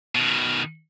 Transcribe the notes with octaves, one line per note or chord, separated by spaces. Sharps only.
B2 D#3